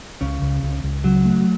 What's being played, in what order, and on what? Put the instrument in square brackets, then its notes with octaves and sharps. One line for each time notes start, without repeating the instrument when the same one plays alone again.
[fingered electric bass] C#2 [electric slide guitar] C#3
[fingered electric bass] C#2
C#2
C#2
[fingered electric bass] C#3 [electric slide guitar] F#3
[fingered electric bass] A3